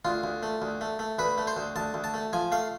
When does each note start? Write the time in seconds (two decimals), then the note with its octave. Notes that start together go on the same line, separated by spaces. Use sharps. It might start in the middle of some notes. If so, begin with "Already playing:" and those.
0.05 D2 F4
0.24 D2
0.43 A3
0.62 D2
0.81 A3
0.99 A3
1.19 D2 B4
1.38 A3
1.47 C5
1.57 D2
1.76 D2 A5
1.94 D2
2.04 A5
2.14 A3
2.33 F3 G#5
2.52 A3 F5